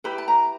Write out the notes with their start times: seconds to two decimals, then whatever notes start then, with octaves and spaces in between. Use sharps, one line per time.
0.04 E4 G4 B4 B5
0.18 A5
0.28 A#5